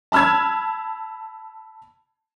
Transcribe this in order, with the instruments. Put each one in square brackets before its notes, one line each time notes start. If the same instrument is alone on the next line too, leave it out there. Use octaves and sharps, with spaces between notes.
[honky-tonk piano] A5 B5 E6 F6 G#6